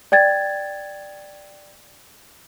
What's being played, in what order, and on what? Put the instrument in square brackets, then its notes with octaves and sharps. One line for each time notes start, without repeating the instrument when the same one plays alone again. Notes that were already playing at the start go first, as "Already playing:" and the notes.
[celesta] D5 G5 G#6 A6